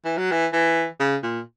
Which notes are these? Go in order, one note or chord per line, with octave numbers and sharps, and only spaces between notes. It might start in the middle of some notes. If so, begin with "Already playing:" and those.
E3
F#3
E3
E3
C#3
A#2